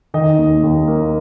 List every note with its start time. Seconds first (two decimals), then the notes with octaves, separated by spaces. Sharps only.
0.14 D#3 D#5
0.38 D#2
0.63 D#2
0.88 A#3